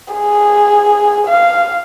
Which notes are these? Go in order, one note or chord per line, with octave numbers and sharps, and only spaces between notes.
G#4
F5